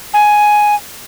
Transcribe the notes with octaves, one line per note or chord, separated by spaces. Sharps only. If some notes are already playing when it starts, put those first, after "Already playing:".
G#5